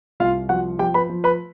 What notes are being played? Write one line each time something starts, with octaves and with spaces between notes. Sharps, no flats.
C2 F4 F5
F3 F#4 F#5
F3 G4 G5
B4 B5
F3
B4 B5